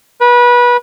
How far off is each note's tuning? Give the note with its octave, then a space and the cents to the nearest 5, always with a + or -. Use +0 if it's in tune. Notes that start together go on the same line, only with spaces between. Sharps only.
B4 -25